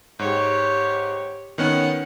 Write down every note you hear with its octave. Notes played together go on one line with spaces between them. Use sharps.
G#2 G4 C#5
D#3 B3 C#4 F#5